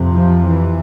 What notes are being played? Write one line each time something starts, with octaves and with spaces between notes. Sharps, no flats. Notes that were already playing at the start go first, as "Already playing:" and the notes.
Already playing: F2 C3
F3
E3